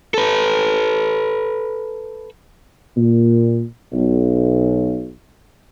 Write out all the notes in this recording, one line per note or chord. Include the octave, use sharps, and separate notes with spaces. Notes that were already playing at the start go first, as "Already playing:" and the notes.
A4 B4
A#2
B1